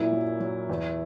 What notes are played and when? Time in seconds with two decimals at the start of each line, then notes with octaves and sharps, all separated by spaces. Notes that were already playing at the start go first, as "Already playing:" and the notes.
Already playing: F#2 A#2 E4
0.12 F#3
0.40 F#3
0.70 E2